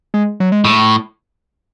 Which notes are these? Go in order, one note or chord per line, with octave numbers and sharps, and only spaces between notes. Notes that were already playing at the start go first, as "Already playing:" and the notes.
G#3
F#3
G#3
A2